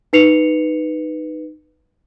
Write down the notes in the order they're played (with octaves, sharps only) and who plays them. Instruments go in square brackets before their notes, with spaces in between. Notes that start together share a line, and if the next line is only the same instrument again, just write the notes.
[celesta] D#4 B4 C7 C#7 F7